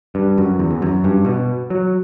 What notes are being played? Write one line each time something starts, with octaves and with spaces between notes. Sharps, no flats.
G2
F#2
E2
E2
F#2
G2
B2
F#3